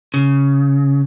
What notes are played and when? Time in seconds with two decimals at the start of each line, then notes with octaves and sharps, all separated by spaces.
0.14 C#3